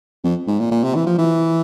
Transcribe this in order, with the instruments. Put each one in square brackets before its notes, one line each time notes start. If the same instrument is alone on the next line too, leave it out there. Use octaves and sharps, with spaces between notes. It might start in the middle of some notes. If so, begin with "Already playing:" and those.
[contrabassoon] F2
G#2
A#2
A#2
C3
E3
F3
E3